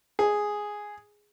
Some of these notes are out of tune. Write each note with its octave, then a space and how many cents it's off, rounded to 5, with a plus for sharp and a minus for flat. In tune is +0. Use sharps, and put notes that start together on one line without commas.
G#4 +0